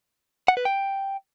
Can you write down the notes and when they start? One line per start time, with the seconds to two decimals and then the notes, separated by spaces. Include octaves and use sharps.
0.48 F#5
0.57 B4
0.65 G5